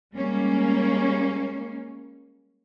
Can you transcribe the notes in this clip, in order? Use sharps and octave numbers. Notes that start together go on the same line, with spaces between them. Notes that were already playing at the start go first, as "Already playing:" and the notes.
G3 G#3 A#3 C#4